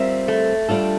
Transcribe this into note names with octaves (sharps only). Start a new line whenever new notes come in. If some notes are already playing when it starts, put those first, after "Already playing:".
Already playing: G3 C4 F4 A#4 E5
A3
G3 D4 F4 A4